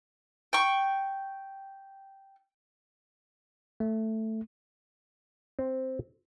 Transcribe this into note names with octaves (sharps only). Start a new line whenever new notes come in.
G5 C#6
A3
C4